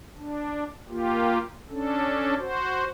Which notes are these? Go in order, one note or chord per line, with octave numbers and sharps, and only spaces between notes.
D4
A#3 F4 G4
C#4 D4 A4
F#4 C5